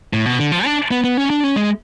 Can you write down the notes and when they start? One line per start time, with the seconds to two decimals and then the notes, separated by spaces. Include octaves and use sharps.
0.13 A2
0.26 B2
0.39 D3
0.52 F3
0.65 D4
0.91 B3
1.04 B3
1.17 C#4
1.30 D4
1.44 C#4
1.56 G#3